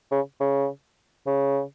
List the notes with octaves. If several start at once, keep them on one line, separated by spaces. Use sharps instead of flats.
C#3
C#3
C#3